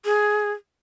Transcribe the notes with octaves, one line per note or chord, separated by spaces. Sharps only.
G#4